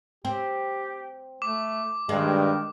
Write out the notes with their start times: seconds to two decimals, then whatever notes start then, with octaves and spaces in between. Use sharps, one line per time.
0.25 C4 G4
1.42 A3 D6
2.09 G2 D#3 G#3